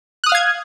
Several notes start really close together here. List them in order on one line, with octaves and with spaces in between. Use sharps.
F#6 D#6 F6 F5 G#6